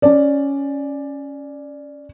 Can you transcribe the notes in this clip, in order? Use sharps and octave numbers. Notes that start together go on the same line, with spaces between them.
C#4 D5